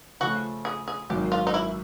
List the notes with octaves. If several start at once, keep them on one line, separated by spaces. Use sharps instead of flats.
C#3 F3 A3 F#4
G#4
G#4
G#1 F#2 D#3 G4
F4
D#4
E4